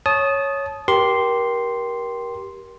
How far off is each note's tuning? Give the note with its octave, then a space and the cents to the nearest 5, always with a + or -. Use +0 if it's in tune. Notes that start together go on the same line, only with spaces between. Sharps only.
C#5 +0 A5 -25 D#6 +0
G4 -10 A#4 +25 C6 +0